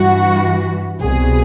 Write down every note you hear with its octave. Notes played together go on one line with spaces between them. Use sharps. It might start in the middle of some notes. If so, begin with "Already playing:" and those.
Already playing: G2 E3 F#4
C2 B2 G#4